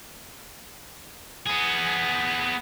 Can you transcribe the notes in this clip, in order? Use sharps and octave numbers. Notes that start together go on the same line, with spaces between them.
B3 G#4